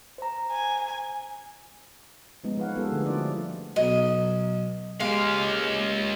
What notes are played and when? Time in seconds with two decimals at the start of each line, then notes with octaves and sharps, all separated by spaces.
0.18 C5 A#5
0.51 G#5
2.44 F3 G#3 B3 C#4 D#4
2.57 F3 A#3 B4 C#5 F5 F#5
2.75 G3 G#3 B3 F4 A4
2.91 D3 F3 A3 G#4 A#4
3.05 F3 D4 E4 F#4 C5 D5
3.21 D5
3.76 B1 F#3 D#5
5.00 C#2 G#3 A#3 G4 F5 B5